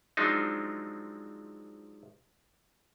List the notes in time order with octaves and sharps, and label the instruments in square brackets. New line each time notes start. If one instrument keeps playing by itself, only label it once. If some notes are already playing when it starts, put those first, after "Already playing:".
[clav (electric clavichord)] F3 F#3 G#3 C4 D4 D#4